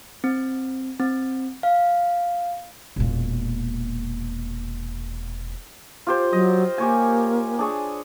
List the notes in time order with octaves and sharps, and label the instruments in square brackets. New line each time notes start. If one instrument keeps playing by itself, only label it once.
[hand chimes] C4
C4
F5
[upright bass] E1 A#2
[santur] F4 G4 C5
[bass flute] F#3 [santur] D#5
[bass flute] A#3 [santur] G4 C#5 G#5
[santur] D4 G#4 C#5